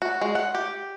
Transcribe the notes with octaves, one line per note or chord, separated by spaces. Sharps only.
F#4
G#3
F#5
G4